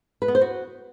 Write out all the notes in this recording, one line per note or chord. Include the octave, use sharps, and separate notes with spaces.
B4
B3
C5
F#4